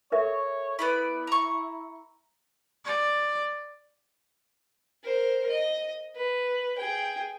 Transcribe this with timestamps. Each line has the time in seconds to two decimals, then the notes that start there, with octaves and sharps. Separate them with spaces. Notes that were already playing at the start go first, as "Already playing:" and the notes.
0.12 A4 A#4 C#5 E5
0.79 B3 E4 D5 B5
1.27 A#5 C#6
2.85 D5
5.03 A#4 C5
5.49 D#5
6.15 B4
6.78 G#4 G5